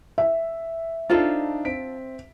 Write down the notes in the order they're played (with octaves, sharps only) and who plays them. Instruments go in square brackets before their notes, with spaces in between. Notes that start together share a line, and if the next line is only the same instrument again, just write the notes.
[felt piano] E5
[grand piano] D4 D#4 C5 [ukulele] F4 A4 F5
[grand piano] C4 B6 D7